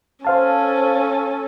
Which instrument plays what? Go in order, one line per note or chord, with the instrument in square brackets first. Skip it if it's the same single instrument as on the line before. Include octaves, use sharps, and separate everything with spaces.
[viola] C#4 A4 [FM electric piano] C5 F5 A5